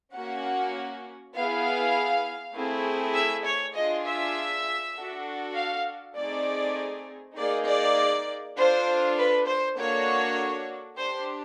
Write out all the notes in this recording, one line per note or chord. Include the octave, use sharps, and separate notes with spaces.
A#3 C#4 F#4 F#5
B3 E4 G#4 F5
A3 C4 E4 G#4
E5
C#5
D4 F4 G#4 D#5
E5
D4 F#4 A4
F5
A3 C4 D#4 G#4 D5
A#3 D#4 G#4 D5
D5
D4 F4 A4 C5
B4
C5
A#3 D4 F#4 A4 C#5
D4 G4 C5